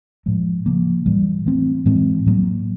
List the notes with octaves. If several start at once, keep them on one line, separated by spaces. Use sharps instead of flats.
A2 F3 G#3
C#3 F3 A#3
A2 E3 G3
E3 A3 C4
A2 E3 G#3 C4
A2 F#3 A#3